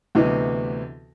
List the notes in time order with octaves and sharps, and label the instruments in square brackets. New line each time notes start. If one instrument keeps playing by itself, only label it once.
[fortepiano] D2 C3 E3 B3 D#5